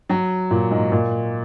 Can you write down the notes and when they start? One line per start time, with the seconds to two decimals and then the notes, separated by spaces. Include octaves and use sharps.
0.09 F#3
0.51 A#2
0.71 G#2
0.92 A#2